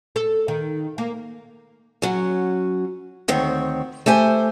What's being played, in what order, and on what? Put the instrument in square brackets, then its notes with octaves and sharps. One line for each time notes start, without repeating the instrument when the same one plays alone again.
[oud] A4
D#3
A#3
[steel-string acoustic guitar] F#3 C#4
D2 D#3 C4 C#5
A3 G4 C5 G#5